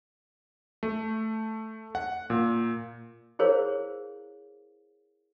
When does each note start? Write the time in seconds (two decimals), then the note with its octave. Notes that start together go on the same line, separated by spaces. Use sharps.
0.83 A3
1.95 F#5
2.30 A#2
3.39 E4 G#4 A#4 C5 C#5 F5